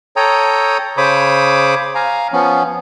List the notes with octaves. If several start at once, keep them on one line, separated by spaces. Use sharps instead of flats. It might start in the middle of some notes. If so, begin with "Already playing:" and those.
A4 C#5 G5 A#5 D#6
C#3 C5 C#5 B5 D6 D#6
F5 G#5 A#5
F3 B3 C#4